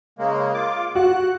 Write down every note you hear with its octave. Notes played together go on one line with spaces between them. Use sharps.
C#3 G#3 A#3
F4 D6
F#4 F#5 F#6